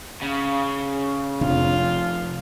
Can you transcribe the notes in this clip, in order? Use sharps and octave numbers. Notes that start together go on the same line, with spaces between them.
C#3
F1 F2 C3 C4 D4 F4